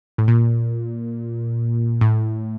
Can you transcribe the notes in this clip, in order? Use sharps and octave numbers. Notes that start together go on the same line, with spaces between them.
A2
A#2
A2